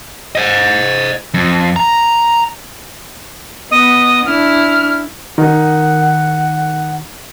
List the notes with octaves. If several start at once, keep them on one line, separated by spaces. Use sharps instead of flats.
C5 D#5
F2
A#5
B3 D#5
D4 E4 F6
D#3 D#4 A#4 F#5